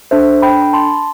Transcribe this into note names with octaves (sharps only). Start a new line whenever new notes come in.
D4 A4 C5 E5
G5 B5
B5
A5 C6